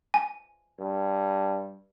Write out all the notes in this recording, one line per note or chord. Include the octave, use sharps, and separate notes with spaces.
G#5
G2